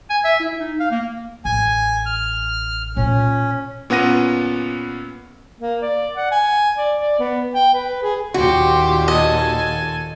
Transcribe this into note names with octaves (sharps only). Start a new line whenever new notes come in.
G#5
E5
E4
D#4
F5
A#3
A1 G#5
F6
A#2 C#4 F4
A#2 B3 C#4 F#5 A#6 D#7
A#3
D5
F#5
G#5
D5
D5
B3
G5
B4
G#4
D#2 A#2 F#4 G4 C6
A4 D#5 G#5